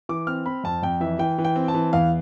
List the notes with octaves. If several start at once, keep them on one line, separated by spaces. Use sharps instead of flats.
E3 D6
C4 F6
C4 B5
F2 A5
F2 G5
E3 E5
E3 G5
E3
G5
C4
A5
E3
E2 F5